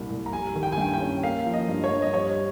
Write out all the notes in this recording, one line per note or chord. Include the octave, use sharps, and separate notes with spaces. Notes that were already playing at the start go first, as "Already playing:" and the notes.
Already playing: C2 A#2 G3
C2
A#5
G3 G#5
D#3
G5
G#5
G2 G5
G5
C#4
A#3 F5
F3
D#5
G2
C#5
G2
D#5
G3 C#5